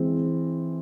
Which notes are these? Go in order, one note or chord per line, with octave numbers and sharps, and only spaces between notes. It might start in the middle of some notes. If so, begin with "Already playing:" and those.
Already playing: E3 G#3 C4